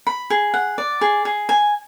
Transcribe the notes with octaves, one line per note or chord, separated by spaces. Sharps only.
B5
G#4
F#5
D5
G#4
G#4
G#5